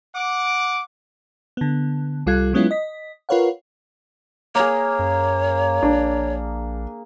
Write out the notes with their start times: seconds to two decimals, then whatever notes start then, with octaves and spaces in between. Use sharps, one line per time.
0.14 F#5 D6
1.57 D3 B3
2.26 C2 G3 F4 A4 F#6 G#6
2.53 F#3 G#3 B3 C#4 E4 F4
2.71 D#5 B6
3.29 F4 A#4 B4 C#5 F5 F#5
4.55 A#3 G#4 C#5
4.99 F#2
5.83 A#1 D4